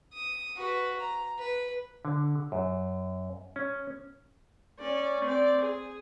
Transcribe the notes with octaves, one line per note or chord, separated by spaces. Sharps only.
D#6
F#4 B4
A#5
B4
D3
F#2
C#4
C#4 D5
C4 D5
G#4